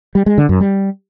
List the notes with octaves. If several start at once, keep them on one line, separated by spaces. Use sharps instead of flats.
G3
G#3
D3
F#2
G3